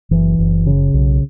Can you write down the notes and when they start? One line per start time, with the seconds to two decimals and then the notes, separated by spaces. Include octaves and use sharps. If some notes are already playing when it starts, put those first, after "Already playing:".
0.11 F#1 E3
0.39 F#1
0.67 C#3
0.94 B1